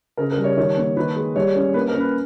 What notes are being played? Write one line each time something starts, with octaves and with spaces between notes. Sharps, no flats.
C#3 A#4
A#4
G3
C#5
D#3 C#5
A#3
D#3 B4
G#3
G3 C#5
C#4
A#3 B4
A#4
C#4
B4